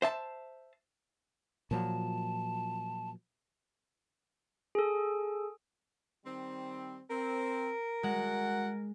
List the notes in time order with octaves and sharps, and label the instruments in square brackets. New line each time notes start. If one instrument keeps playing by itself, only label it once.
[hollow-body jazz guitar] C5 E5 A5
[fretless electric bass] A#2 F3 F#3 [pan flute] A5
[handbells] G#4 A4
[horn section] D#3 G3 C4
[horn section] C4 [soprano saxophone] A#4
[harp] G#3 [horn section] F#4 F#5